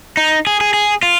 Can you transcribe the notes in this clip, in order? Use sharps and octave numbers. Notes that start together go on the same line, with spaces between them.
D#4
G#4
G#4
G#4
F4